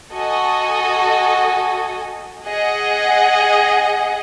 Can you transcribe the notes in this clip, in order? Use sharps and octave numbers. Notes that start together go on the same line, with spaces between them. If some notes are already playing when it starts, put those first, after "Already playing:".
F#4 A4 D#5 G#5
G#4 D#5 F#5